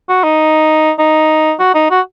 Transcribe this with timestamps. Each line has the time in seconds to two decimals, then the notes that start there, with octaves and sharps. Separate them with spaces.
0.09 F#4
0.23 D#4
0.99 D#4
1.59 F#4
1.75 D#4
1.91 F#4